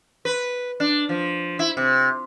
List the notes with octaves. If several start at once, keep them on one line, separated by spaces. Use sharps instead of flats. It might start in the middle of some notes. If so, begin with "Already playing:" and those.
B4
D4
F3
E4
C3